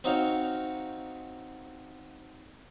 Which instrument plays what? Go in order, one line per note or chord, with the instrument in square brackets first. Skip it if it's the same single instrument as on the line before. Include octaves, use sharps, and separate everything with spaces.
[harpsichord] C4 D#4 F#4 C#5 F5